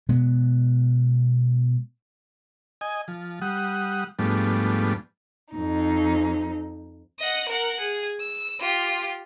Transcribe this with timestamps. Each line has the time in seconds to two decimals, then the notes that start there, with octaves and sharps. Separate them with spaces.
0.09 B2 G#3 B3
2.81 D#5 G#5
3.08 F3
3.42 G3 F#5 D#6
4.19 G#2 F3 G3 A3 B3 D4
5.55 F2 D#4
7.19 D#5 F#5
7.49 A#4 F#5
7.79 G#4
8.20 E6
8.61 F4 G4